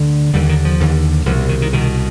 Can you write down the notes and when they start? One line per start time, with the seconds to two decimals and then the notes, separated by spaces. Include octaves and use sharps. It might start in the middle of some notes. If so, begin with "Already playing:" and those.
Already playing: D2 D3
0.34 D#2 D3 G3
0.49 D#3
0.65 F3
0.80 D#2 D3
1.26 C2 B2 F3
1.49 D#3
1.62 D#3
1.73 C2 B2 D#3